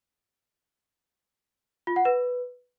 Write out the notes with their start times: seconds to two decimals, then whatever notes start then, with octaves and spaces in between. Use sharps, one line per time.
1.87 F4
1.96 F#5
2.05 B4